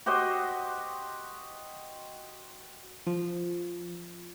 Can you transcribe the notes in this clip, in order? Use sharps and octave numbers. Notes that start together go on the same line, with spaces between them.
F#4 G4 C5 D#5
F3